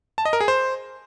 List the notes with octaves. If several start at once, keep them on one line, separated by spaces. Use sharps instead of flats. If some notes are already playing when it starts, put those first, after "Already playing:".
A5
D#5
A#4
G#4
C5